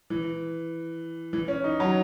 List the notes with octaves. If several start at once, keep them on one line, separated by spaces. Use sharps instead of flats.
E3
E3
C#4
D#4
F#3